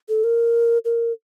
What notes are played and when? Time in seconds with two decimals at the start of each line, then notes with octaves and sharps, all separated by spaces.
0.09 A4
0.24 A#4
0.85 A#4